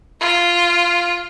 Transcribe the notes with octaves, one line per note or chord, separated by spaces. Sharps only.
F4